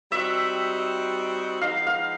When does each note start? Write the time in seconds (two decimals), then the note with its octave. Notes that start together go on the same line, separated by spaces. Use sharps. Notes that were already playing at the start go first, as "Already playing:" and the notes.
0.12 G3 C4 D#4 F#4 E5
1.61 F3 G#3 B3 D#4 F5
1.87 F5